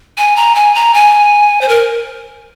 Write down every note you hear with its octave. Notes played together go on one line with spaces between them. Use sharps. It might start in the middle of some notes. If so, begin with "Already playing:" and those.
G#5
A#5
G#5
A#5
G#5
C5
A#4